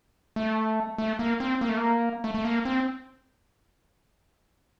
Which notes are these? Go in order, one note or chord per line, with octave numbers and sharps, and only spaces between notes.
A3
A3
A#3
C4
A#3
A3
A#3
A3
A3
A#3
C4